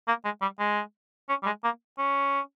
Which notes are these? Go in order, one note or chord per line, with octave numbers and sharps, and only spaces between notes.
A#3
G#3
G3
G#3
C#4
G3
G#3
A#3
C#4